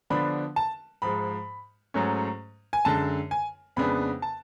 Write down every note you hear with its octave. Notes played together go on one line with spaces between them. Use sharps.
D3 F3 B3 D4 B5
A5
G#2 F3 G#3 B5
G#2 F#3 A3 C#4
G#5
F#2 D3 G#3 A5
G#5
F2 C#3 G#3 B3 D4 B5
A5